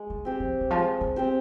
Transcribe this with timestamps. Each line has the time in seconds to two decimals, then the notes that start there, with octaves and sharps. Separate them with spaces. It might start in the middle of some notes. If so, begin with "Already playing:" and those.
Already playing: G#3
0.10 D#3
0.25 C4 G4 C5
0.40 F3
0.61 D#3
0.70 F3 G#3
1.01 D#3
1.16 C4 G4 C5